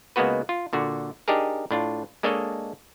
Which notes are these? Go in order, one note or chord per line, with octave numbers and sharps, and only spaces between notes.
C#2 G#3 A#3 B3 F#4 B4
F4
A#2 D3 F#4
D4 D#4 G4 G#4 A#4
A2 D4 F4
G#3 A#3 D4 A4 C#5 D#5